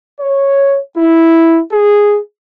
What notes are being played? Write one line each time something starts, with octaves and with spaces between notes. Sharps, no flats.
C#5
E4
G#4